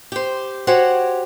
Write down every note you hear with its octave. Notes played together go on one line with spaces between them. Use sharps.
G4 C5
F#4 G4 C5 C#5 F#5 G#5